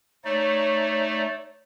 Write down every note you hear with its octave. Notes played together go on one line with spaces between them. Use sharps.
A3 D#4 C#5 D5